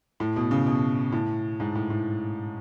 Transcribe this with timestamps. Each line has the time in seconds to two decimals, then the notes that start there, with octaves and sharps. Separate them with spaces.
0.20 A2
0.36 B2
0.51 C#3
0.66 B2
1.12 A2
1.60 G#2
1.75 A2
1.90 A2